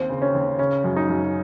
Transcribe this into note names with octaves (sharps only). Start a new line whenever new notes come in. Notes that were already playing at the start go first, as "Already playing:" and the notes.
Already playing: D#2 C4
C#3
C#4
D#2
C#3 C#4
F#2
D#4
F#2